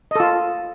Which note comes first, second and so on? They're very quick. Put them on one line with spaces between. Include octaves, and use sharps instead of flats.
D#5 A4 F4